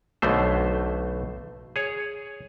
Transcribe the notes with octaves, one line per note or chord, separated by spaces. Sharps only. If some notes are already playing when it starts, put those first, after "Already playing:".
B1 B2 D3 A3 C5
G#4 C#5